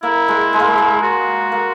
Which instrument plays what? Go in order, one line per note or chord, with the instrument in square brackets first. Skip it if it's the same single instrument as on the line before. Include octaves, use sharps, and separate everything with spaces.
[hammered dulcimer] A#3 [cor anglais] E4
[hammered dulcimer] G#3
G#3
A#3
G#3
G#3
[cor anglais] F#4
[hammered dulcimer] A#3